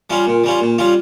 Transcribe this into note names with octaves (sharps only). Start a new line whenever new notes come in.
G3 C#4 F4
A#2
G3 C#4 F4
A#2
G3 C#4 F4